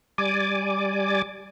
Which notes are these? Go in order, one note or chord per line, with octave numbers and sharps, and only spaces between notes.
G3 D5 G#5 D6